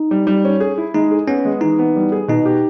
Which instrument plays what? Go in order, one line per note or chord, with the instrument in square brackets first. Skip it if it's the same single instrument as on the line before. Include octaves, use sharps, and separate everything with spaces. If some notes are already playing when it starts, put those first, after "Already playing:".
Already playing: [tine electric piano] D#4
[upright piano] G3
G3
C#4
G#4
E4
[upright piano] G#3 [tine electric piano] D#4
[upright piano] G#4
[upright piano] B3 [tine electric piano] C#4
[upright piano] G#3
[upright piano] E3 [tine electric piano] D#4
[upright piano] B3
G3
G#4
[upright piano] B2 [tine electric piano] D#4
[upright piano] G4